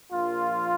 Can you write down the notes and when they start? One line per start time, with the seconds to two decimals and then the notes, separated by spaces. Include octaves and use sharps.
0.10 A#1 A#2 F3 A#3 F4